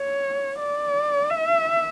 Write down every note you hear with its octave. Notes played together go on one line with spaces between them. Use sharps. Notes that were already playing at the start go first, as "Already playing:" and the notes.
Already playing: C#5
D5
E5